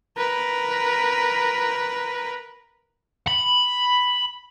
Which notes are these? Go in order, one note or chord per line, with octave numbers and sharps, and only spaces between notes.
A#4 B4
B5